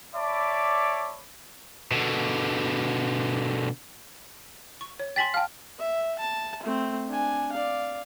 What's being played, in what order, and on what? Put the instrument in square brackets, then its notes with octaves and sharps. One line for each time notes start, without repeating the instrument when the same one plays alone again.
[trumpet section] C#5 D5 E5 A5 B5 D6
[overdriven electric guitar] B2 D3
[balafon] C#6
C#5
[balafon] G5 G#5 C6 [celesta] A6 B6 F#7
[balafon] F5 G5 [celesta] A5 F6
[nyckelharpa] E5
A5
A3 C4
D4 G#5
D5 F5